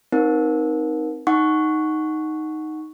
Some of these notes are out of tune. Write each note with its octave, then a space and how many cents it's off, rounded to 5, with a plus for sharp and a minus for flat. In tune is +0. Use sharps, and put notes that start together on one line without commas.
C4 +0 D#4 +5 A#4 +25
D#4 +0 F#5 +0 C#6 +0